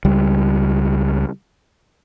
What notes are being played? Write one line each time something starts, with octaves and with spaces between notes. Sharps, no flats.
C#2 G3